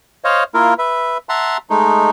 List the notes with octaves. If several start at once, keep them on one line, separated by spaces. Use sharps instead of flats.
C5 C#5 D#5 F5
A#3 E4 F4 A#4
B4 E5
E5 F#5 A5 A#5 C6
G#3 A3 D#4